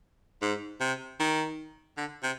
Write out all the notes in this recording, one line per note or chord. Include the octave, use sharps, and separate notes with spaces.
G#2
C3
D#3
D3
C3